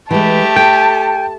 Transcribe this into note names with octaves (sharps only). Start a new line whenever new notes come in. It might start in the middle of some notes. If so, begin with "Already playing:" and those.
E3 G#3 A3 G4 A5
A4 G5